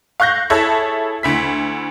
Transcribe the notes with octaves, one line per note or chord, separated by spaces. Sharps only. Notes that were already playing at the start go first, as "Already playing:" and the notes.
F5 C#6 F#6 G6 A#6
E4 G#4 A4 C#5 E5 A5
D2 E4 B6